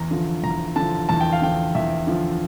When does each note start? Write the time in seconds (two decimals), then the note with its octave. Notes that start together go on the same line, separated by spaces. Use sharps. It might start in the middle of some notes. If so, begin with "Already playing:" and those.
Already playing: E2 A#5
0.11 D3 F3
0.44 E2 A#5
0.76 D3 F3 A5
1.09 E2 A5
1.21 G5
1.33 F5
1.42 D3 F3 G5
1.75 E2 E5
2.07 D3 F3